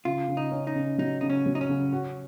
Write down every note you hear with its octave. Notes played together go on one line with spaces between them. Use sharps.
C#3 F4
C#3
D#4
C#4
D#4
C#3
F#3 D#4
C#3 D#4
C#4
F#3
D#4
C#4
C#3
F#4